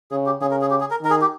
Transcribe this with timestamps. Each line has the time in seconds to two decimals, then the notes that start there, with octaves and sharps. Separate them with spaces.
0.11 C#3 G#4
0.26 G4
0.41 C#3 G#4
0.51 A#4
0.61 G#4
0.71 G4
0.80 G#4
0.91 A#4
1.01 D#3 A#4
1.11 G#4
1.21 G4